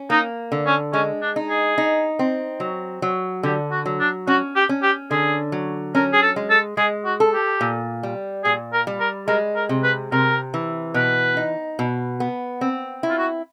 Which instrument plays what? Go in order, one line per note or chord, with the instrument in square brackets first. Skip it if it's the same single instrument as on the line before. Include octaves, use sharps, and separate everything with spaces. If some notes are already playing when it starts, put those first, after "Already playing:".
Already playing: [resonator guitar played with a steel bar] C#4
[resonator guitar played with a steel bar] A#3 [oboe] D#4
[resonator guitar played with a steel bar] D3
[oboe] C#4
[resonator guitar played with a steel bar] G#3 [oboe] C#4
[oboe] D4
[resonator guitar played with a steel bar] D#4
[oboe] G#4
[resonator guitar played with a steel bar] D#4
C4
F#3
F#3
[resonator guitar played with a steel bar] D3 [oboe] G4
[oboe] F#4
[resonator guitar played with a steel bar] F#3
[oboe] D4
[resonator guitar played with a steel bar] C#4 [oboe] F#4
[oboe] G4
[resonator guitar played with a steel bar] C#4
[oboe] G4
[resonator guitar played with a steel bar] D3 [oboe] G#4
[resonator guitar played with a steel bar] F#3
[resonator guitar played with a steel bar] C#4 [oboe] A#4
[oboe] G#4
A4
[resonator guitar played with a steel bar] G#3
[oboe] A4
[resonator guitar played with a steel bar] G#3 [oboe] G#4
[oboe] F#4
[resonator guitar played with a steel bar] A4
[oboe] G4
[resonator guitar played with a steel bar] A#2
G3
[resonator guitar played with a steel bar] A#2 [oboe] G#4
[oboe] A#4
[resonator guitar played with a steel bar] G3
[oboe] A#4
[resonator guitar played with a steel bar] G#3 [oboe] A#4
[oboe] A#4
[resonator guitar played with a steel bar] C3
[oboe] B4
[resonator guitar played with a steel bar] C3 [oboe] A#4
[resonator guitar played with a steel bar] E3
[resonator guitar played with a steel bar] B2 [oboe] B4
[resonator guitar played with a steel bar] D#4
B2
B3
C4
E4
[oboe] F4
F#4